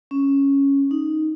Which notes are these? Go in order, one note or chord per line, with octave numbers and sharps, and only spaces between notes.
C#4
D#4